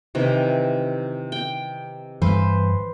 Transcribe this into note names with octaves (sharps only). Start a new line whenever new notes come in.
C3 D#3 E3
G5
G2 E3 B4 C5